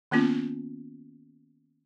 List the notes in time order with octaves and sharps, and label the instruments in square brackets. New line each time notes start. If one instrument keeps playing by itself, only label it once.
[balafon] D#3 A#3 B3 C#4 F4